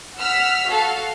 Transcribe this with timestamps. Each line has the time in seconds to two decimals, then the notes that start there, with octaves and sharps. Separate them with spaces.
0.18 F#5 E6 F6 B6
0.68 F#4 A4 F5